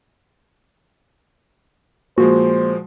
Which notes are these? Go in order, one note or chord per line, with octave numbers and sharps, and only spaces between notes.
A#2 F3 G#3 A#3 F#4 C5